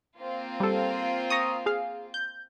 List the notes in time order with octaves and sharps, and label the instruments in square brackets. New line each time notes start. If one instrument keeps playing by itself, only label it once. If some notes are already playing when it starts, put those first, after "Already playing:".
[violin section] A#3 C4 F4
[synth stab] G3 A4
A#5 C#6 D#6
G#4 F5
G6